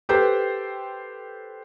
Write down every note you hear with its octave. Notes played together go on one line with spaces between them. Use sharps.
G4 A4 B4 C5 G5